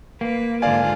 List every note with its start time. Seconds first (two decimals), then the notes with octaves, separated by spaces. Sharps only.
0.21 A#3 B4
0.62 G#2 D3 F4 D5 F5 G#5